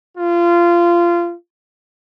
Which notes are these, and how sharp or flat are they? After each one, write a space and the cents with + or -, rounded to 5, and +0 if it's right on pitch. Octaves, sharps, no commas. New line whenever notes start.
F4 -20